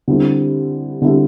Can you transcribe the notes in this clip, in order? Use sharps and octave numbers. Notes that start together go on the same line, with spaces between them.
D3 G3 C4 E4 G4
D3 G3 C4 E4 G4